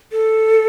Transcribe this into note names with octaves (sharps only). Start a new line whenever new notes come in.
A4